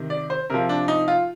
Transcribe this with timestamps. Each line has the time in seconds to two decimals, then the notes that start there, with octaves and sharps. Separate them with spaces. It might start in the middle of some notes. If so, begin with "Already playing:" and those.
Already playing: C3 D#3
0.10 D5
0.30 C5
0.50 C3 F3 A#4
0.69 D4
0.88 D#4
1.08 F4